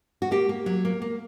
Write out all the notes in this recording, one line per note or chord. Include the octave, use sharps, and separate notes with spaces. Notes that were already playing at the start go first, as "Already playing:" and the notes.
F#4
A#3 G4
A#3
F#3
A#3
A#3